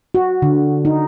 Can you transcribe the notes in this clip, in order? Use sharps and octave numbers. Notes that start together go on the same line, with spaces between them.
F#4
D3
D#4